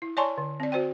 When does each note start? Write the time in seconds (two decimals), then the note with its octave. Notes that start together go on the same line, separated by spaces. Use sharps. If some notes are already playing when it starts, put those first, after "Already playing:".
0.02 E4
0.17 C#5 D5 G#5 A5 C6 C#6
0.38 D3
0.60 C4 D5
0.72 F#4 C5 D5 G5